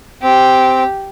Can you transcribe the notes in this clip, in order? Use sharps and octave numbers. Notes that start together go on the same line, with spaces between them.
C4 G4